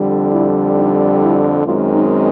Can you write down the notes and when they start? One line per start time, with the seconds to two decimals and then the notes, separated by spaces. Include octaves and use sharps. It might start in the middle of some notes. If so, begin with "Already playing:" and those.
Already playing: F2 D3 G3
0.32 E4
0.75 D#4
1.21 E4
1.65 F#2 D#3 G#3 C4 F4
1.94 D#4